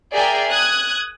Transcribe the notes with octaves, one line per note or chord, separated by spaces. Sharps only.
G#4 A#4 D5 E5 G5 G#5
D#6 F#6 G#6